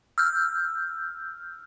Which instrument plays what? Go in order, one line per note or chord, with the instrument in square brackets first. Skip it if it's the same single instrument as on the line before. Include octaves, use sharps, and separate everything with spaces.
[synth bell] E6 F6 G6